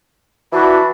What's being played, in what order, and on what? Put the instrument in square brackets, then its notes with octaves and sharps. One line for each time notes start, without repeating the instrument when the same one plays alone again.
[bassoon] E3 [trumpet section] D4 B4 [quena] F#4